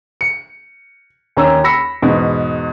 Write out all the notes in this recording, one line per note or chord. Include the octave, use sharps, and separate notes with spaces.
C#7
D#2 C#4 A#5 E6
B5 E6 A#6 B6 C#7
E2 G#2 B2